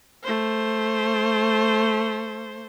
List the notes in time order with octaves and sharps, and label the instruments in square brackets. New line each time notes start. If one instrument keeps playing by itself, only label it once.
[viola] A3 C5